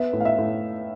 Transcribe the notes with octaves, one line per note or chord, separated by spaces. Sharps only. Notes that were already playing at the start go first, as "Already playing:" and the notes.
Already playing: B3 E5
A2
F5
E5
A2